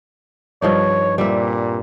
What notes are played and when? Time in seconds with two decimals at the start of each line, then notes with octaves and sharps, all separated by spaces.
0.62 G2 F3 D#4 C#5
1.18 A#2 G3 C4 E5